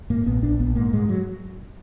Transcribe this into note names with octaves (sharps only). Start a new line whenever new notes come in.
G#2 A#3
A#1 B3
A#1 D4
A#1 B3
G#2 A#3
G#2 G#3
F#3